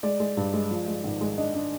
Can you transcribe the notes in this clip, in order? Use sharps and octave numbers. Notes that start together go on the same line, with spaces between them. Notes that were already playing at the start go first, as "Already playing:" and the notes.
G#3 D5
G#3
G2
G#3
F3
G#3
G#1
G#3
D4 D#5
D4